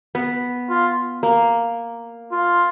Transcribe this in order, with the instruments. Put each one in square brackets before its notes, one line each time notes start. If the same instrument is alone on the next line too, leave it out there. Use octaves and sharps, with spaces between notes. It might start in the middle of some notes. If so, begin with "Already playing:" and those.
[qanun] B3
[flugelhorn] F4
[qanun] A#3
[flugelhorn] F4